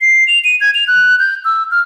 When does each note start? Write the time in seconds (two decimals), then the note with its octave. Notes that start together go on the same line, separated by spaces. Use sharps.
0.01 C7
0.27 F7
0.44 D#7
0.61 G#6
0.75 F7
0.88 F#6
1.19 G6
1.45 E6
1.71 F6